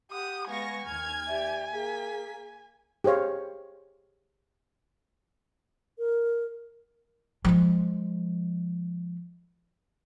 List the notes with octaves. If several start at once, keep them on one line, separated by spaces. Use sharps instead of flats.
G4 F#5 D#6
G#3 B3 F5 G#5 C#6 A#6
D#2 F6 G#6
G4 D5 E5
A#3 G#4 B6
G4 G#4 C5 C#5 F5
A#4
F3 G#3